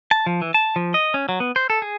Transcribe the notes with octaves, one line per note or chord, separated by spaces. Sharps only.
A5
F3
E3
A5
F3
D#5
C#4
F#3
B3
C5
A4
G#4